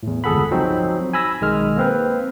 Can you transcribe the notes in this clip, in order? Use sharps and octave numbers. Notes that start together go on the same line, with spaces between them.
E2 A2
G1 C#2 G#4 A4 F#5 B5
F3 F#3 C4 D#4 F#4
G#5 B5 E6 A#6
B1 D#3 G#3 F6
A#3 C4 B4